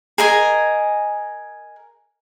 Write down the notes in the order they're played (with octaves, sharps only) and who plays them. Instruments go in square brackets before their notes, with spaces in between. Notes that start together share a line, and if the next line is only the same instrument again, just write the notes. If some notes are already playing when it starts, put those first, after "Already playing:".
[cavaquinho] G#4 A#4 D#5 G#5